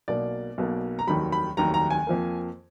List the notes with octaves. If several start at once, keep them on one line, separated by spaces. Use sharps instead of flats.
B1 B2 A#3 D5
B1 B2 A#3
A#5
F1 D#2 D#3 F#3 B5
B5
F1 D#2 D#3 F#3 A#5
A#5
G#5
F2 F3 A#3